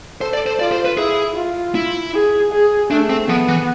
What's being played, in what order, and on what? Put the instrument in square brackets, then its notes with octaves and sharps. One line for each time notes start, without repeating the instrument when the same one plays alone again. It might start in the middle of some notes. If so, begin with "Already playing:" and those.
[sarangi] A4 [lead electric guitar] C5
[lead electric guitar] D5
C5
[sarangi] F4 [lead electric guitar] D5
[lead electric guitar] C5
B4
[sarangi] E4 [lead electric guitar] G#4
[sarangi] F4
[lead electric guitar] E4
[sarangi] G#4
G#4
[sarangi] A3 [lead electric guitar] D4
[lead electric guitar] C4
[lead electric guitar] F3 [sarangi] B3
[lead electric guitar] E3